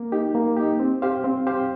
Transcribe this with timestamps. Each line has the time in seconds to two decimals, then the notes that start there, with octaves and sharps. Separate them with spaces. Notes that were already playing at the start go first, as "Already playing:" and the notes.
Already playing: A#3
0.12 D#4 G4
0.35 A#3
0.56 D#4 G4
0.79 C4
1.02 G4 C5 F5
1.24 C4
1.47 G4 C5 F5